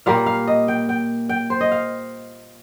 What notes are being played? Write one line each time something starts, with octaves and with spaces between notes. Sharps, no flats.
A#2 G3 A#3 F5
F5
D#5
G5
G5
G5
C5
D#5
F5